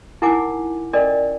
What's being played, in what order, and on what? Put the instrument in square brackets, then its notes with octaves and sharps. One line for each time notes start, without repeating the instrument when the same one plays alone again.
[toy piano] D#4 E4 A#4 F#5 G#5 D6
C#4 D4 A4 A#4 D5 D#5